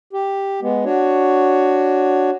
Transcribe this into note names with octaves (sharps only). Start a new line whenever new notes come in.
G4
G#3 B3
D4 F#4 C#5